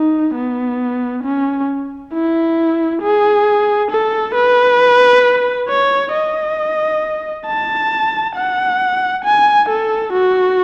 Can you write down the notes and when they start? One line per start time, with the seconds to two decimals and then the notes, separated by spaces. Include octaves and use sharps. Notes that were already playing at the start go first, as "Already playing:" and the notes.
Already playing: D#4
0.35 B3
1.24 C#4
2.13 E4
3.02 G#4
3.91 A4
4.35 B4
5.69 C#5
6.13 D#5
7.47 A5
8.35 F#5
9.25 G#5
9.69 A4
10.13 F#4